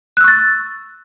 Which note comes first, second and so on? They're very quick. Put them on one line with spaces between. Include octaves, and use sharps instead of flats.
F#6 E6 C#6 A6